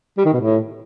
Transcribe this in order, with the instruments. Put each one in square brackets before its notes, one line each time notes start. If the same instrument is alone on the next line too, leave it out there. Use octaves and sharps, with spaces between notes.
[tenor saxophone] G3
D#3
B2
A2